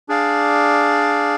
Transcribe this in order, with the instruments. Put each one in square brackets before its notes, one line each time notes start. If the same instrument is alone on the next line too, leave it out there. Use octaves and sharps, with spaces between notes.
[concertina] D4 G#4 D5 F5